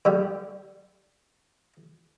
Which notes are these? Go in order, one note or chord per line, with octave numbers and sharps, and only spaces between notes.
D3 G3